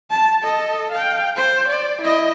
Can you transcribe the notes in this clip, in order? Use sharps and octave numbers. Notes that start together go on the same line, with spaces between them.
A5
A4 D#5
F5 G5
C5
D5
E4 D#5